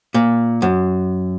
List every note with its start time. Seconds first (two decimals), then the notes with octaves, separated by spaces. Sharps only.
0.14 A#2
0.62 F#2